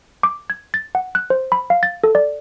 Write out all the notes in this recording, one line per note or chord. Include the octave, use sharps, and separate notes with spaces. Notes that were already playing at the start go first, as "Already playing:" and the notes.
D6
G#6
A6
F#5
F#6
C5
B5
F5
A6
A4
D5